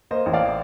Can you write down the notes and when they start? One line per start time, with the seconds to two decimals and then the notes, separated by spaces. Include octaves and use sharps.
0.11 A#3 C5 D#5
0.26 A1
0.33 D5 F5